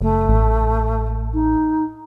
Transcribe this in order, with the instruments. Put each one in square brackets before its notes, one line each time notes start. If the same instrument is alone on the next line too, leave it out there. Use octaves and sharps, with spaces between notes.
[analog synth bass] F#1 [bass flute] A3
[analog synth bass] A1
[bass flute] D#4